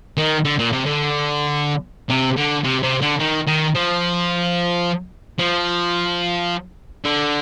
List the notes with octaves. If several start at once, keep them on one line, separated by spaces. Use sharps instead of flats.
D#3
D3
A#2
C3
D3
C3
D3
C3
C3
D3
D#3
D#3
F3
F3
D3